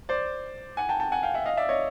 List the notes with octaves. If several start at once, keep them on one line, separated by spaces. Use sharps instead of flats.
C5 D5
F#5 G#5
G5 A5
G5 A5
F#5 G#5
F5 G5
E5 F#5
D#5 F5
D5 E5
C#5 D#5